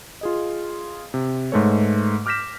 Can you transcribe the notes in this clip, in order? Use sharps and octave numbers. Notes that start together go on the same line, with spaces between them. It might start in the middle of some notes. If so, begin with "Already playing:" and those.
F4 G#4 D#5
C3
G#2 G#3 A3 B4 C#5
D6 F6 G6 A#6 B6 E7